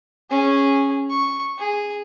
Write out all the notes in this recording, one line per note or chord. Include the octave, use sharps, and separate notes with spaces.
C#4 G#4
C#6
G#4